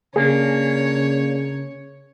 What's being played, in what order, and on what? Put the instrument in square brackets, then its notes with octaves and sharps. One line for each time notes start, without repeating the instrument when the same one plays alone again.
[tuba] C#3 [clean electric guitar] A#3 D4 [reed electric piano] G#4 [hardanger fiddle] C#5